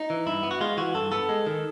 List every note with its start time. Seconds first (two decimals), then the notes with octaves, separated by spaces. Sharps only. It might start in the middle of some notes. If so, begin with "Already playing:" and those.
Already playing: D#4
0.10 E3
0.26 G2 E4
0.43 B3
0.51 F#4
0.61 G#3 F4
0.77 E3 F#4
0.95 G2 A4
1.12 B3 A4
1.29 G#3
1.47 D#3